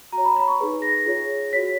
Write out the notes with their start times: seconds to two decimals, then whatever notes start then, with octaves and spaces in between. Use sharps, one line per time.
0.13 F#4 C#5 A#5
0.25 B5
0.37 B5
0.48 C#6
0.60 D#4 G#4 B4
0.82 A#6
1.06 F4 G#4 C#5
1.53 F#4 C#5 B6